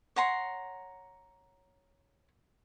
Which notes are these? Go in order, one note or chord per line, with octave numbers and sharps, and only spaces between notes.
C#5 F#5 A#5 C6